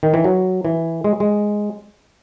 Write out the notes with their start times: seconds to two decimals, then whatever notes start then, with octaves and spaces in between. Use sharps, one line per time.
0.03 D#3
0.14 E3
0.24 F#3
0.65 E3
1.04 G#3
1.20 G#3